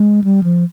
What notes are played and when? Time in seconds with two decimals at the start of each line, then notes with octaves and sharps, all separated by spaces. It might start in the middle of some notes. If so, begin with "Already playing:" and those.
Already playing: G#3
0.24 G3
0.44 F3